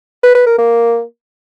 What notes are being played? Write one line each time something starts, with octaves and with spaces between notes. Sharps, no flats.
B4
B4
A#4
A#3